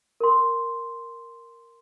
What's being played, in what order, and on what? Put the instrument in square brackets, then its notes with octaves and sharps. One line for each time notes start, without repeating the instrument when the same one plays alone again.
[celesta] A#4 C6